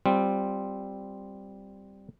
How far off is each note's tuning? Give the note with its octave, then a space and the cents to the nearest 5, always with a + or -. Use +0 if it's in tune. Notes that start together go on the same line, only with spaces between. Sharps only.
G3 +0 C4 +0 F4 -5